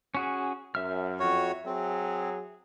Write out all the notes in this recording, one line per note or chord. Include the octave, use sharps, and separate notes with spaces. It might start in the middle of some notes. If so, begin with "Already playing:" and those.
C#4 F#4 G#4
F#2 E5 F6
F2 F#4 C#5
F#3 C4 G#4